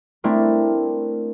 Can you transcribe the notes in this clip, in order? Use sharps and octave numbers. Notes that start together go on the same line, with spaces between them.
A3 C4 D4 E4 A#4